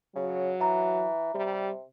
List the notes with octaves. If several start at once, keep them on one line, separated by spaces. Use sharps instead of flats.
C#3 F#3
E3 E5 A#5
C3 G3